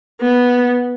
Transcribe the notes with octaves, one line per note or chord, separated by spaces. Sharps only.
B3